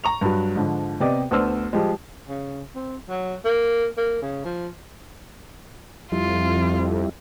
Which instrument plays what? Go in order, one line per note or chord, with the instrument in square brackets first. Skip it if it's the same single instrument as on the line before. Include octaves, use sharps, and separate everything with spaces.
[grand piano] A#5 C#6 F7
G2 F#3
G#2 D3 F3
C3 B3 G4 D5 D#5
D2 B3 D4 C5 E6 F6
F3 G3 G#3
[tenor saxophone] C#3
C4
F#3
A#3
A#3
C#3
F3
[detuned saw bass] F2 [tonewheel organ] G3 E4 [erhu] F4